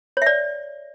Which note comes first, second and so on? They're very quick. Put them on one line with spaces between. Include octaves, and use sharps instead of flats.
C#5 E5 D5